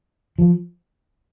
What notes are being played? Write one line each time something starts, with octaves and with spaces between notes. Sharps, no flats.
F3